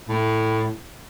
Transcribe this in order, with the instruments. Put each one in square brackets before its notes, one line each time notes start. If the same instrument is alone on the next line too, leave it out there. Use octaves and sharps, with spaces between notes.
[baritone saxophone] A2